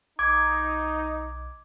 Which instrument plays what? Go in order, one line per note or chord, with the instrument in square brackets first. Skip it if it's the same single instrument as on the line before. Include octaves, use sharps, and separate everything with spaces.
[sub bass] B1 [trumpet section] D#4 [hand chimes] D6 [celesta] G#6